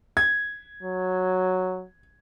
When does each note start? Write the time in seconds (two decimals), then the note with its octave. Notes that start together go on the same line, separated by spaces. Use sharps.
0.17 G#6
0.82 F#3